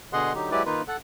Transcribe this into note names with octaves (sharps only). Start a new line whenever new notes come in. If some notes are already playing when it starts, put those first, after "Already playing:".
B2 D3 G#4 D#5 F#5 C6
D3 F#3 D#4 G4
F#3 G#3 E4 G4 B4 D5
D#3 A#3 D#4 F4 B4
A4 F#5